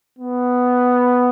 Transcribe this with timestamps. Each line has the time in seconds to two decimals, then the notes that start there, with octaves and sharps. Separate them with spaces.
0.19 B3